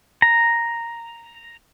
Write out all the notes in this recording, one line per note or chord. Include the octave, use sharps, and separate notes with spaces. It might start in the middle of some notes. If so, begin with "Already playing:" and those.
A#5